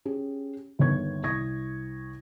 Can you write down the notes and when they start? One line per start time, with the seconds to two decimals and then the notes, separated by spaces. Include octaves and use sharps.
0.05 C#4 G4 G#4
0.79 G1 D#2 B3 C#5 C#6 G#6
1.24 C2 C#6 D#6 G#6 A#6